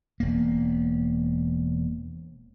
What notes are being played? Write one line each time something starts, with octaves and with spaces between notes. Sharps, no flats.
E1 A#3